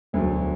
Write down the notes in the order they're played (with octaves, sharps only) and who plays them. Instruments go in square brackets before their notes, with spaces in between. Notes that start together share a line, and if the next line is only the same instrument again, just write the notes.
[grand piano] E1 D2 D3 F#3 A3